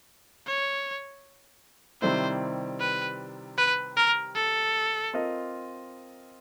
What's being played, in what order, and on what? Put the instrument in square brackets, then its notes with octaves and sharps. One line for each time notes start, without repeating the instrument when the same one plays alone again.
[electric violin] C#5
[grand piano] C3 D#3 G3 C4 E4 [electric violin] C5
[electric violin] B4
B4
A#4
A4
[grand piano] C4 F4 A#4 D#5